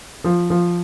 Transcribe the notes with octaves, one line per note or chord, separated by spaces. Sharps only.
F3
F3